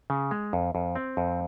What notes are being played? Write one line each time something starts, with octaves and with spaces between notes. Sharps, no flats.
C#3
G#3
F2
F2
C4
F2